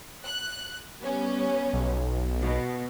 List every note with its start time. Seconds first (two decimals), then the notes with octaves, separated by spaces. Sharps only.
0.24 F#6
0.99 G3 B3 C#4
1.73 B1
2.42 B2